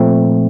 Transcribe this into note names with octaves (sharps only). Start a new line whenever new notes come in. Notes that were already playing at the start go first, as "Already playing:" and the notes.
Already playing: A#2 F3 A3 C4